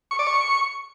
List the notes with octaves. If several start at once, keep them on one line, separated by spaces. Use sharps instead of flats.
C#6
D5
C#6